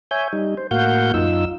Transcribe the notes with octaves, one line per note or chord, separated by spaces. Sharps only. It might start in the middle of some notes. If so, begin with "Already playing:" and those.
C#5 E5 G#5 G6
G3 D#4
C5
A2 A#3 F#4 F5 F#5 G6
F#2 D#4 F4 E6